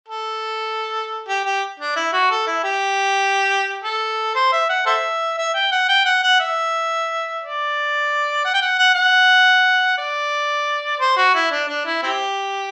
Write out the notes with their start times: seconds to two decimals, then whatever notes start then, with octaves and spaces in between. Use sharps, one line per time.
0.08 A4
1.29 G4
1.45 G4
1.79 D4
1.96 E4
2.13 F#4
2.31 A4
2.47 E4
2.64 G4
3.84 A4
4.35 C5
4.52 E5
4.69 F#5
4.86 A4 C5 E5
5.38 E5
5.54 G5
5.71 F#5
5.89 G5
6.05 F#5
6.23 F#5
6.40 E5
7.42 D5
8.45 F#5
8.54 G5
8.62 F#5
8.79 F#5
8.95 F#5
9.98 D5
11.00 C5
11.17 F#4
11.35 E4
11.52 D4
11.68 D4
11.86 E4
12.03 C4 E4 G4